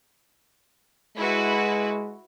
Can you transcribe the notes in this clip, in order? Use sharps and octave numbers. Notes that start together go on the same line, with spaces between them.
G#3 E4 F#4 B4